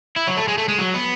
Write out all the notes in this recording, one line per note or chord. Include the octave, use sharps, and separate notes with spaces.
E4
F#3
A3
G#3
A3
G#3
F#3
B3